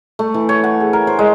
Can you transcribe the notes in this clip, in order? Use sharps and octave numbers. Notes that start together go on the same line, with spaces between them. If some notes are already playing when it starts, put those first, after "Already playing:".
A3
E3
C#5
F#5
G#4
A#4
C5
G#3